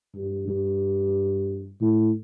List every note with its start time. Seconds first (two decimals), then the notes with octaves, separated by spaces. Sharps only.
0.15 G2
0.48 G2
1.81 A2